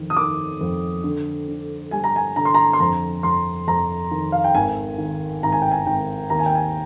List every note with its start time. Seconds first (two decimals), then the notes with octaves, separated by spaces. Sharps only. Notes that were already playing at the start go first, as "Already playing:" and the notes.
Already playing: F2 D#3
0.10 D#6
0.17 D#3 D6
0.61 F2
1.04 D3
1.48 D3
1.91 G3 G#5
2.04 A#5
2.16 G#5
2.36 D3 A#5
2.45 C6
2.54 A#5
2.73 C6
2.80 F2 A#5
3.23 F2 C6
3.67 F2 A#5
4.11 D#3
4.32 F5
4.44 G5
4.55 G#1 G#5
4.98 D#3
5.43 G#1 A#5
5.53 G#5
5.62 G5
5.71 G#5
5.86 G#1 G5
6.30 D#2 A#5
6.39 G#5
6.46 G5
6.55 G#5